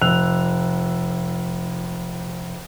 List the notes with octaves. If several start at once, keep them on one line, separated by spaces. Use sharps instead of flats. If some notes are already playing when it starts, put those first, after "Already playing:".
F1 E6 F#6 F7